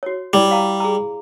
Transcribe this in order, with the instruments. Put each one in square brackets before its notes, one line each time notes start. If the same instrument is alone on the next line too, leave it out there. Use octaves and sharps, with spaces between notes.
[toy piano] F#4 C#5
[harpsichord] G3 [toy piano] E4 D5
[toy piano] F5 A#5
G#4 A#5